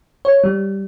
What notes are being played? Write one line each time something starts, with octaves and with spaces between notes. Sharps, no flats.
C#5
G3